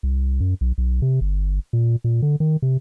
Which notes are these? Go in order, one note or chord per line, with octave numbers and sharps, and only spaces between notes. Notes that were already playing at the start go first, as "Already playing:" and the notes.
C2
F#2
B1
B1
C3
G1
A#2
A#2
D3
D#3
C3